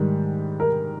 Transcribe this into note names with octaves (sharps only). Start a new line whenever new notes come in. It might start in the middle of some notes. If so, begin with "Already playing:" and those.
Already playing: G#2 D#3 G3
A#4